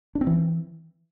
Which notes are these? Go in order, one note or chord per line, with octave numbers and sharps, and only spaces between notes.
D4
C4
E3